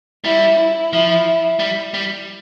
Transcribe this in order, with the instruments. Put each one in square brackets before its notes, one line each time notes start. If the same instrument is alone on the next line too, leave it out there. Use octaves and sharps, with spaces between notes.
[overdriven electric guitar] G3 [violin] E4
[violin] E4
[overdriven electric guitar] F3
G3
G3